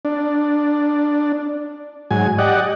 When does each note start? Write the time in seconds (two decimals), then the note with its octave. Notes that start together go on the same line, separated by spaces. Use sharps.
0.05 D4
2.11 G#2 F#3 G#5
2.38 G4 D5 D#5 F#5